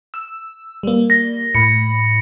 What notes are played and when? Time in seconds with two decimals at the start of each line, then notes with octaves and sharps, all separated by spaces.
0.14 E6
0.83 G3 A#3
1.10 A#6
1.55 A2 B5 C#7